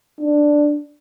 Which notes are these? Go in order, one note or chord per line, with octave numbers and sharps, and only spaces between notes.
D4